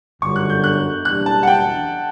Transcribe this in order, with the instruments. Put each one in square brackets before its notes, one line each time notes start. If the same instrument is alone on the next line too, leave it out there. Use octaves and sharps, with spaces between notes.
[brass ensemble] G1 F#2 D3 [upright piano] C#6
[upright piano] F#6
G6
F#6
[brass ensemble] F#1 E2 B2 G3 D4 [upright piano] F#6
[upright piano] A5
F#5
G5